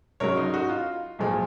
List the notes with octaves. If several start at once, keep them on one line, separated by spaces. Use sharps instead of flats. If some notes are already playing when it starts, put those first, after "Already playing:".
C#2 C#3 F#3 A#4 C#5
D#4
D#4 F#4
F4
B1 A#2 F3 G#3